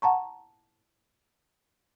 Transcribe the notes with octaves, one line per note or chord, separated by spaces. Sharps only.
F#5 A5 A#5 C#6